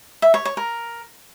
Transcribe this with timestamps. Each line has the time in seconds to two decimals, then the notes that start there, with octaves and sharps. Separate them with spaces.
0.22 E5
0.34 C#5
0.45 C#5
0.57 A#4